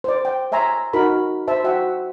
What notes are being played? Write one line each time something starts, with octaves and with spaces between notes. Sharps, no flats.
C5 D5
G5
C#5 E5 G#5 A#5 C6
D#4 F#4 A#4 B5
C5 E5 A5
F#4 E5 F#5 G5